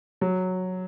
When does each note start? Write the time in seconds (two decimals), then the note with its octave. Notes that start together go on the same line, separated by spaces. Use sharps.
0.21 F#3